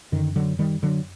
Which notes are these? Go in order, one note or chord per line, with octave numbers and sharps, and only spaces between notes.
F#2 D3 D#3
D3 F#3
D#3 G3
D3 F#3